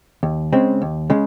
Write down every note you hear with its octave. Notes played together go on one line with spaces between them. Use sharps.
D#2
C#3 G#3 C4
D#2
C#3 G#3